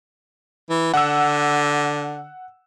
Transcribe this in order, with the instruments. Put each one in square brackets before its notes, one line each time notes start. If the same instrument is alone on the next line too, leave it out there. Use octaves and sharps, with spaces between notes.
[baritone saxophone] E3
[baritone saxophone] D3 [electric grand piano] F#5 E6